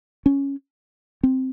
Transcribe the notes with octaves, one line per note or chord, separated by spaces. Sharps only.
C#4
C4